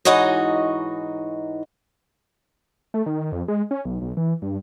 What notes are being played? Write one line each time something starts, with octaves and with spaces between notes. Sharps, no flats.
G#2 E3 D#4 F#4 C#5 D#5
A3
D#3
F2
G#3
C#4
B1
B1
E3
G2